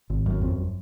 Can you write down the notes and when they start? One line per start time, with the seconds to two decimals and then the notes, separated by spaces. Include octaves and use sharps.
0.10 G#1
0.26 F#2
0.42 F2